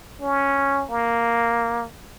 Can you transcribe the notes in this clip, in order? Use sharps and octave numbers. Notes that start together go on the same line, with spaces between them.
C#4
A#3